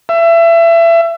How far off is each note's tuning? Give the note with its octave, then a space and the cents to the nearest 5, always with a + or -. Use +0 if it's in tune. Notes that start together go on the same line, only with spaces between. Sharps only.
E5 +25